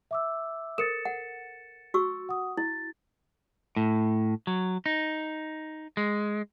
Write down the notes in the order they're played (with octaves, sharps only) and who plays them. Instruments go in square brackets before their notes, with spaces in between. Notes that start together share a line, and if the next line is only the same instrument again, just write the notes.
[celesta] E5 D6 E6
[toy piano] A4 A#4 C5 [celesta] A6 C#7 E7
[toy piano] F#5
F#4 C#6 E6
[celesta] F#5 D#6
[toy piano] E4 [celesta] A6
[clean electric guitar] A2
F#3
D#4
G#3